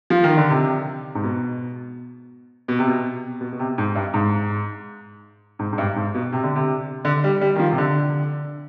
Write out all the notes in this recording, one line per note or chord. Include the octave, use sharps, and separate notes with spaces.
F3
D#3
D3
C3
G#2
B2
B2
C3
B2
B2
B2
C3
G#2
G2
G#2
G#2
G#2
G2
G#2
B2
C3
D3
C3
D3
G3
G3
D#3
F3
C3
D3